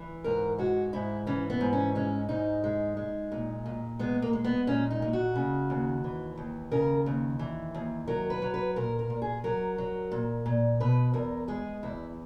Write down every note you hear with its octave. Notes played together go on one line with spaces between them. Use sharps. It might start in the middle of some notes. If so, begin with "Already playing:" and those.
Already playing: E3
G#2 A#4
G#3 F#4
G#2 E4
E3 C#4
B3
G#2
C#4
G#3 C#4
G#2 D#4
G#3
G#3
A#2
A#2
G#3 B3
A#3
G#3
B3
A#2 C#4
D#4
A#2
F#4
C#3
D#2
E3
D#2
C#3 A#4
D#2
E3
D#2
F#3 A#4
B4
F#3
B4
A#2 A#4
A#4
A#2
G#4
F#3 A#4
F#3
A#2
A#2
B2 B4
E2 A#4
G#3 G#4
E2 E4